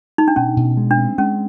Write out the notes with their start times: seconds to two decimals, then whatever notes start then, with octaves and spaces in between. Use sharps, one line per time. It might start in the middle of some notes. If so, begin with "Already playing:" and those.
0.18 D#4
0.28 D4
0.36 B2 C#4
0.57 B2
0.77 G#3
0.91 D4
0.98 C4
1.18 G#3 C#4